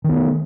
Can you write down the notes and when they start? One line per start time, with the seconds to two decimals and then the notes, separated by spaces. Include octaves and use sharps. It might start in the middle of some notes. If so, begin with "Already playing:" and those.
0.04 D#3
0.09 B3
0.14 A3